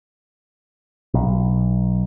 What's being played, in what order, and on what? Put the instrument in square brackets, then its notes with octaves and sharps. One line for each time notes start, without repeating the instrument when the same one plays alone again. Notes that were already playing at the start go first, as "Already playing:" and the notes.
[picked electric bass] B1